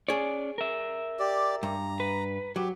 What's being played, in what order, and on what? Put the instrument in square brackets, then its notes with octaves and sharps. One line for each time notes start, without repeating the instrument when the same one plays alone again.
[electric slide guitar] C#4 D5 [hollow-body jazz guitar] G#4 C#5
[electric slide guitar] A#4 E5
[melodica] G4 D5
[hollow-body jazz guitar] G2 [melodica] A#5
[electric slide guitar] B4
[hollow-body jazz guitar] F#3 [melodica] G4